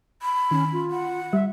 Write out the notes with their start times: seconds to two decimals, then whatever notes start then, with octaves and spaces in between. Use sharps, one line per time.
0.22 B5
0.51 D#3 C#4
0.73 F4
0.91 F#5
1.33 G3 E5